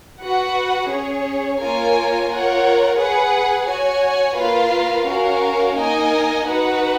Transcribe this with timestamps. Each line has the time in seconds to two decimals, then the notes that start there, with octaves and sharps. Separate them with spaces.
0.20 F#4 B4 F#5
0.89 C#4 G#4 C#5
1.58 A#3 F4 A#4 C#5 G#5
2.28 F4 A#4 C#5 F#5
2.97 G#4 B4 F#5
3.67 F#4 C#5 G#5
4.37 A#3 F4 B4 F5
5.06 C#4 F#4 A#4 F5
5.76 A#3 D#4 A#4 D#5 G#5
6.45 D#4 F#4 B4 F#5